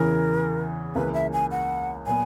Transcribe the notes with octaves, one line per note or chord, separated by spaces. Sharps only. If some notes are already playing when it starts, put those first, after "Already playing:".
Already playing: E2 C#3 E3 A#4
C#2 C#3 E3 A#3 B4
E5
G#5
F#5
A#2 F#3 B3 G#5